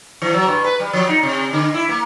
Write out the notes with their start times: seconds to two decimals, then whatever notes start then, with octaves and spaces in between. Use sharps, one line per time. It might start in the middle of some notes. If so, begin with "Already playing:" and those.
0.22 E3
0.34 F#3
0.47 G2
0.64 B4
0.80 G3
0.93 F3
1.09 D#4
1.23 C3
1.53 D3
1.74 E4
1.89 A#3